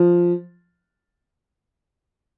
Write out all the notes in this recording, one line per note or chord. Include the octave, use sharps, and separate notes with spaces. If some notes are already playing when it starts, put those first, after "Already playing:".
Already playing: F3